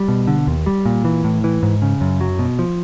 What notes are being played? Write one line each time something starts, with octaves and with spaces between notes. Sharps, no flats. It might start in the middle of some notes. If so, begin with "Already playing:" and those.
Already playing: G3
B2
D3
D#2
G3
A#2
E3
A2
E3
G#2
C#3
F#2
F#3
B2
F3